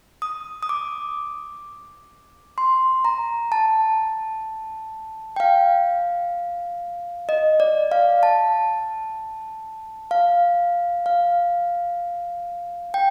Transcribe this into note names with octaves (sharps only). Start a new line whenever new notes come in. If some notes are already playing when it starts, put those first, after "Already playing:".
D#6
D#6
D6
C6
A#5
A5
G5
F5
D#5
D5
F5
A5
F5
F5
G5